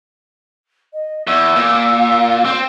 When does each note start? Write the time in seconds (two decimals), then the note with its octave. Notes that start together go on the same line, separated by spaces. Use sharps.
0.93 D#5
1.27 E2 E6
1.56 A#2
2.45 C4